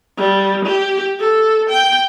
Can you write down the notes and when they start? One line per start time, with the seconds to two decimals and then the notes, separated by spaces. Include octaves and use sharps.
0.18 G3
0.65 G4
1.19 A4
1.70 G5